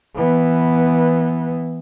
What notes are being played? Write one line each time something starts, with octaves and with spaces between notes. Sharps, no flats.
E3 B3